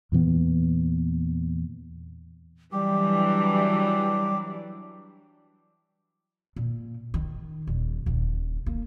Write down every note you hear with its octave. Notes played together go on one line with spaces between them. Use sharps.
E2 A#2 E3 B3
E3 F#3 G3 D4 G4
A#2
D#3
D#1
D#1 D3
A#3